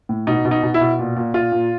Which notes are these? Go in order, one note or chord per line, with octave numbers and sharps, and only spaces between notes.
A2
B2 D#4
B2
D#4
B2
E4
B2
A#2
A#2
A#2 F4
A#2